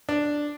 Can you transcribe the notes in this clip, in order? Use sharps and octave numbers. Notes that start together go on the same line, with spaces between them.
D4